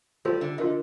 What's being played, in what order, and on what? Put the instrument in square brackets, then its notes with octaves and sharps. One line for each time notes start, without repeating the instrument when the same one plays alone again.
[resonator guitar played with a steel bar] G3 [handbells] F4 A4 C5
[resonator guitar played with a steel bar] D3
[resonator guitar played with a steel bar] D3 [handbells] F4 A#4 D#5